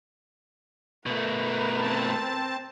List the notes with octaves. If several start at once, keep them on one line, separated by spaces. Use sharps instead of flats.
B2 A3 A#4 B4
C4 A5